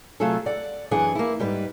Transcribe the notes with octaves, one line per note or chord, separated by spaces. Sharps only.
C3 F#3 A3 F4 G#4 A4
D5 F#5
F#2 E3 D4 G#4 F#5 G#5
A#3 E4
G#2 G3 B4